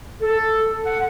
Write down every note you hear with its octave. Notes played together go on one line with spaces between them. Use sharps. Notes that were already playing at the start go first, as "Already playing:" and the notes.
A4
F#5